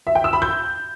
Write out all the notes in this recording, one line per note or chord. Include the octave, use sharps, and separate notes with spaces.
E5
G5
E6
B5
G6